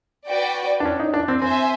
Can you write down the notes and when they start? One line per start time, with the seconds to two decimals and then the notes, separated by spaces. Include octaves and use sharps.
0.28 F#4 B4 D5 G5
0.80 D4
0.85 C#4
1.00 D#4
1.14 D4
1.28 C4
1.42 C4 C5 E5 G#5